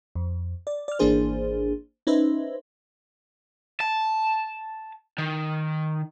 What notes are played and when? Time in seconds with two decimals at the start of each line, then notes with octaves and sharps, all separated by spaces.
0.15 F2
0.67 D5
0.88 D5 F6
0.99 G#1 E3 A#3 D4 G#4 C5
2.07 C#4 D#4 B4 C5 E5
3.80 A5
5.18 D#3